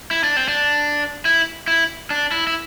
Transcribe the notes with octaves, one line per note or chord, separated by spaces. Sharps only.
E4
D4
C4
D4
E4
E4
D4
E4
E4